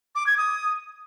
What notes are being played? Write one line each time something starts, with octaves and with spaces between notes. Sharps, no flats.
D6
G#6
D#6